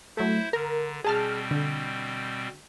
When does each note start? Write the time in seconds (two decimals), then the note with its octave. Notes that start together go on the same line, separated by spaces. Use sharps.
0.17 F#3 A3 E4 C5 E5
0.53 D3 A#4 A#5
1.04 B2 G3 C4 G#4 A5 F6
1.51 D3